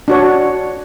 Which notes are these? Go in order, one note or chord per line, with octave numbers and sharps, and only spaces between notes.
D4 F#4 C#5